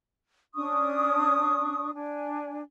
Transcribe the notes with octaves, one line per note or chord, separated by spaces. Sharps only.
C#4 D4 C#6 D#6
D4 G#5